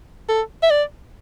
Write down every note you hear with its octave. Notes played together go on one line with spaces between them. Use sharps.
A4
E5
D5